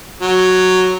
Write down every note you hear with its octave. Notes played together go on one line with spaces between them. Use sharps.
F#3